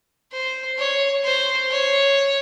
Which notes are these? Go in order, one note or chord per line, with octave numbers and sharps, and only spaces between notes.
C5
C#5
C5
C#5